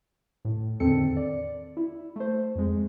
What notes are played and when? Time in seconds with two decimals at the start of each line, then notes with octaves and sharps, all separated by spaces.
0.45 A2
0.80 E2 D3 D#3 C4 A4 C#7
1.17 D5
1.77 E4
2.16 A3 C5
2.55 F2 G#3